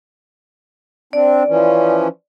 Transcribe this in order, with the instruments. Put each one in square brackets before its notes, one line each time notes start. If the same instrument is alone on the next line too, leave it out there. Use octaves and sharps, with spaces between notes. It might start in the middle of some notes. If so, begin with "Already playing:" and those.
[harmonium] C4 D4 [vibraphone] D5
[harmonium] E3 F3 C#4